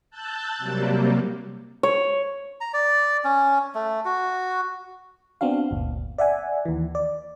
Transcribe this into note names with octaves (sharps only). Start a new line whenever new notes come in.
A5 E6 F#6 G6 A6
C3 F#3 G3 A#3
C#5
A#5
D5
C#4
A3
F#4
B3 C4 D4 F#4 F5
G1 D2 A#2
D5 E5 F#5 G#5
D#2 E3
D5